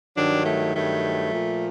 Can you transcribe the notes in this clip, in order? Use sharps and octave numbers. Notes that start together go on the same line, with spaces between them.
G2 D#3 F#3 D4
A3
G2 D#3 F#3 A3
A#2 F3